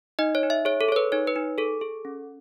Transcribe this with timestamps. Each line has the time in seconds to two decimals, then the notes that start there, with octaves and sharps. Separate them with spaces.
0.19 D#4 D#5
0.35 C#5
0.43 D#4
0.50 E5
0.65 G#4 C#5
0.81 A4
0.88 G#4 C#5
0.96 B4
1.12 D#4 C#5
1.27 B4
1.36 D#4
1.58 G#4 A4
1.81 G#4
2.05 C#4